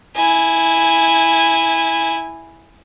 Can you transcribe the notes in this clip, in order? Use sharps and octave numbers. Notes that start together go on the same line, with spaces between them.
E4 G#5